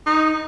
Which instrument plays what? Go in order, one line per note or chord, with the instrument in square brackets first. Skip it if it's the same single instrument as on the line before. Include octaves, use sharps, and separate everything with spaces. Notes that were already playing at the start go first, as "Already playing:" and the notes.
[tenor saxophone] D#4